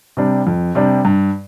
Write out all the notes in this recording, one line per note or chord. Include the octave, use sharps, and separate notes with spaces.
C3 G3 D4
F2
C3 G3 D4
G2